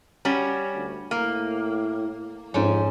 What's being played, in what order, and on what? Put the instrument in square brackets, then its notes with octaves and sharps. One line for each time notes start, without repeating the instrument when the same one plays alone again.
[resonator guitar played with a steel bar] G3 C#4 F#4
[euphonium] D2
[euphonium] A2 [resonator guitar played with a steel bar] A#3
[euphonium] F2 [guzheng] G#2 C#4